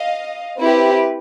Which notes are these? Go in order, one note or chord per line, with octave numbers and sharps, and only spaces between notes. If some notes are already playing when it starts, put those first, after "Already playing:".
Already playing: D#5 F5
C4 E4 G4 B4